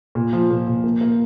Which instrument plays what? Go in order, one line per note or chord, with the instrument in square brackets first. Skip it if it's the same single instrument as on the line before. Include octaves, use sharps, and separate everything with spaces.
[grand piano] A#2
F3
A#2
A#2
A#3
A#3